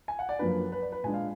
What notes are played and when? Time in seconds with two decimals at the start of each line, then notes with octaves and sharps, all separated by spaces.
0.08 G#5
0.19 F#5
0.29 D5
0.39 F#2 F3 A#3 D4 B4
0.72 B4
0.82 D5
0.92 B4
1.04 A#2 G#3 D4 G#5
1.14 F5